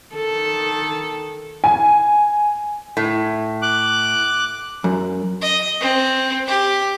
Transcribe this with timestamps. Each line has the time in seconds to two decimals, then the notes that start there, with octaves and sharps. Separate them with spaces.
0.15 D#3 A4
1.64 G#5
2.97 A2
3.62 D6 F#6
4.84 F#2
5.41 D#5
5.80 C4
6.47 G4